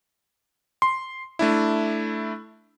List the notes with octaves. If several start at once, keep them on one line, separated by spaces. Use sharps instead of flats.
C6
A3 D4 E4